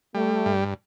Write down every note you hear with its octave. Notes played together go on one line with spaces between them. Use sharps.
G3 A3
G2